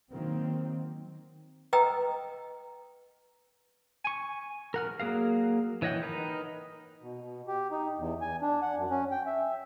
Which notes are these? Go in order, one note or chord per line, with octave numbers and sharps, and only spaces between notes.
D#3 F#3 A#3 C4
B4 D#5 G5 A#5 D#6 E6
G#5 C#6
A#4 F#5 F6
F#3 A#3 G#4 A#4 F5
E3 C#5 D#5 F#5 G5
D#4 A#4 B4
B2
B2
G4
D#4
E2
G#5
D4
F#5
F#2
C#4
G5
E5